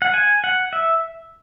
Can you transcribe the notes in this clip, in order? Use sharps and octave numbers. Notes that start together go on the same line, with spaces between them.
F#5
G#5
F#5
E5